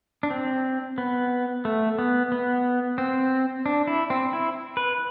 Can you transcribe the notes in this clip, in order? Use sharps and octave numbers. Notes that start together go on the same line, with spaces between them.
D4
C4
B3
A3
B3
B3
C4
D4
E4
C4
E4
B4